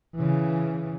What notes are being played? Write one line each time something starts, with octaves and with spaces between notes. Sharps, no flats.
C#3 E3